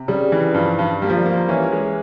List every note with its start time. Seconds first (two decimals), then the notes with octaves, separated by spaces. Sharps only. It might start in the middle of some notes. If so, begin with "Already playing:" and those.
Already playing: C3
0.08 C#3 G3
0.32 E3
0.54 G2 F3
0.79 G2
1.02 G3 A#3
1.10 F3
1.17 G3
1.26 A#3
1.33 F3
1.49 E3 C#4
1.72 G#3